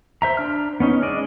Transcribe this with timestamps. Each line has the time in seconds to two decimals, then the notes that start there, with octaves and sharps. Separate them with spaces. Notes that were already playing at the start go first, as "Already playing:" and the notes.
0.22 C5 E5 A#5
0.37 D4 F6
0.80 B3 C#4 D#4
1.02 G#3 D5 D#5